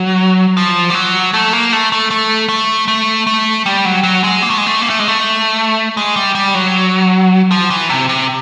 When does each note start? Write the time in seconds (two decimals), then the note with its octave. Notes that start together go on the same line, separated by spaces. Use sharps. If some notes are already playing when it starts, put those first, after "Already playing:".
Already playing: F#3
0.57 F3
0.90 G3
0.95 F#3
1.34 A3
1.53 A#3
1.72 A3
1.92 A3
2.11 A3
2.49 A3
2.88 A3
3.27 A3
3.66 G3
3.85 F#3
4.04 F#3
4.24 G#3
4.42 A#3
4.50 A3
4.58 G#3
4.67 A3
4.82 A#3
4.90 A3
4.99 G#3
5.08 A3
5.97 G#3
6.16 G3
6.35 G3
6.55 F#3
7.51 F3
7.70 E3
7.90 C3
8.09 C3